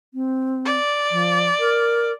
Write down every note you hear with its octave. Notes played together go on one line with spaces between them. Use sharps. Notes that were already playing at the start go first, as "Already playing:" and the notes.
C4
D5
F3
A#4